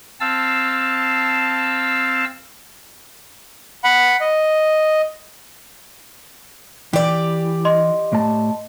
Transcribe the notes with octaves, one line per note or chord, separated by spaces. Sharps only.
C4 F5 A5 E6
F#5 B5
D#5
E3 G4 D5
D#5 C6
A2 A5